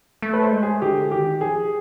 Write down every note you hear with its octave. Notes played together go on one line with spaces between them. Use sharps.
A3
B4
C5
G#3
G#4
D3 G4
D#3 G4
F3 G#4